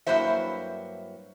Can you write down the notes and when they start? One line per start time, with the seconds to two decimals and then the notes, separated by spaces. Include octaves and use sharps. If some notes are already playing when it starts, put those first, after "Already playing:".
0.07 G2 F#3 A#3 E4 C5 E5